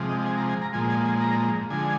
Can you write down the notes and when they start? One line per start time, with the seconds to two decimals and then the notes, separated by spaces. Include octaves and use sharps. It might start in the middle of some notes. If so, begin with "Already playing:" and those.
Already playing: C3 F3 G#3
0.09 D#5
0.26 G#5
0.38 A#5
0.49 G#5
0.62 A#5
0.73 A#2 F3 G#3 G#5
0.90 G#5
1.06 G#5
1.21 A#5
1.70 D3 F3 G#3 G#5